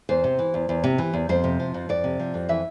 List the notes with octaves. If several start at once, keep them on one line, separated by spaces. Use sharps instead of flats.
E2 C5
C3
E3
E2
E2
C3
E3
E2
F2 C5
C3
F3
F2
F2 D5
C3
F3
F2
E3 E5